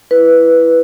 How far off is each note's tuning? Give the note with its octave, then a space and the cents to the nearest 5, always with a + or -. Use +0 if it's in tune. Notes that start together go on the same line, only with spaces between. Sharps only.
E4 +10 B4 -5